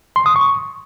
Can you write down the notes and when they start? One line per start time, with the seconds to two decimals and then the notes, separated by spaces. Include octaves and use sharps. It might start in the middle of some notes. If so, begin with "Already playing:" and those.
0.16 C6
0.26 D#6
0.36 C#6